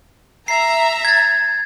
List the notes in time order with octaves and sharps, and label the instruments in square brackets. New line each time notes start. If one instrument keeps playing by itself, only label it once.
[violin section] E5 A#5 [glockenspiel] C7
[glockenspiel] G#6 A6